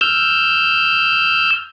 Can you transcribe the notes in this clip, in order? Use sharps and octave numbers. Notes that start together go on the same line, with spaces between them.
E6 F6 G6